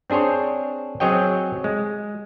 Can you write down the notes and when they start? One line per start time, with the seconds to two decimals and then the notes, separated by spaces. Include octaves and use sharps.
0.10 C4 D4 G#4 C5 C#5
1.00 F#3 C4 G#4 C#5 D#5 G5
1.64 G#3